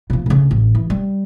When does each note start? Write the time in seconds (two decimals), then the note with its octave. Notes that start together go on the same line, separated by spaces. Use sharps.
0.10 B2 F3
0.26 D2 C#3
0.51 A1
0.75 E3
0.90 G3